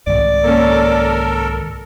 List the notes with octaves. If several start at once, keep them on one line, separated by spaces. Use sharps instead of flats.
C2 G#2 D#3 D5
A#3 C#4 A4 A#4